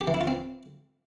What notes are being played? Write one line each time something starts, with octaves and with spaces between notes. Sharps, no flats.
G4
E3
E4
F4
C4